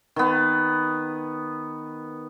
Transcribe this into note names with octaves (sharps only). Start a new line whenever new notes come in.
D#3 B3